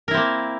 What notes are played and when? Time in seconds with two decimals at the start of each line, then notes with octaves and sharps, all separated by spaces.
0.08 A#4
0.11 E4
0.14 C4
0.17 A#3